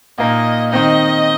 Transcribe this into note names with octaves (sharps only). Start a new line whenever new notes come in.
A#2 A#3 D#4 D#5
D#3 C4 D#4 D#5